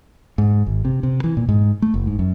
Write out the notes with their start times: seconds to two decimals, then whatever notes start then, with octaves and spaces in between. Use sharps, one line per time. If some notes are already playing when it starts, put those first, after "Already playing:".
0.38 G#2
0.67 G#1
0.85 C3
1.03 C3
1.24 E3
1.37 A#2
1.49 G#2
1.82 A3
1.94 F#1
2.07 G#2
2.19 F#2